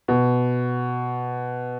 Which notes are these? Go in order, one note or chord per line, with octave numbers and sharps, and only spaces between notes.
B2